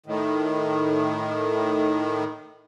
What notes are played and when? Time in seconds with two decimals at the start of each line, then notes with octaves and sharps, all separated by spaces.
0.06 A2 D#3